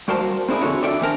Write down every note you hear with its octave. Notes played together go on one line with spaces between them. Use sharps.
G3 F#4 A#4 C5 F5 A5
C4 D4 E4 G#4 A#4
F2 D3 F#4 A4 C#5
D4 F4 A4 D5 E5 G5
E3 C4 A#4 A5